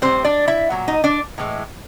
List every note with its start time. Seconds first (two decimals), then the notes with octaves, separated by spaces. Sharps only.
0.02 A2 E3 G3 C4 C5
0.24 D4 D5
0.48 E4 E5
0.70 A#2 F#3
0.88 D#4 D#5
1.04 D4 D5
1.38 A2 E3 G#3